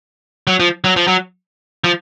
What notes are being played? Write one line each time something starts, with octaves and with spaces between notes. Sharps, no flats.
F#3
F3
F#3
F3
F#3
F3